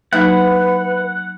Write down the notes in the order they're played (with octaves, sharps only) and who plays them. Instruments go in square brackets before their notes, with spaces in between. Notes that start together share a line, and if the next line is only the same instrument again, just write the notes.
[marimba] F#3 A#3 D#4 [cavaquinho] E4 [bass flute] B4 [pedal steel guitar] F#5